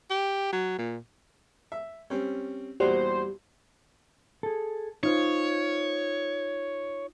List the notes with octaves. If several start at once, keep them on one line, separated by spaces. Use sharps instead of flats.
G4
F#3
A#2
E5
G3 C4 C#4
E2 A#2 G3 F#4 C5
G#4 A4
D#4 F4 C5 C#5